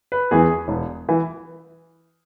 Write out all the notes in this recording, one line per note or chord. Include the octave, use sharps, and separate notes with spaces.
B4
E2 E3 G#4
E1
E3